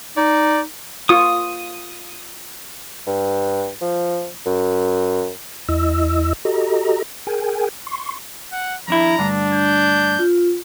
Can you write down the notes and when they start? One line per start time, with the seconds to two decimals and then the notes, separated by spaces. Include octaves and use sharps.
0.17 D#4 D5
1.09 F4 C#6 D#6
3.07 G2
3.81 F3
4.46 F#2
5.69 E2 E4 D#5 E6
6.45 F#4 G4 A4 D#5 A#5
7.27 G#4 A#4 G5 G#5
7.87 C6 C#6
8.52 F#5
8.88 F2 D4 E4 A#5
9.19 D2 G2 D3 D4
9.54 G6
10.19 F4